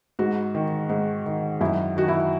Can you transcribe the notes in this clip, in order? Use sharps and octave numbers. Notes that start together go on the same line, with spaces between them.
G#2 F#4
D#3
G#2
D#3
F#2 E4
D#3 F#4
E4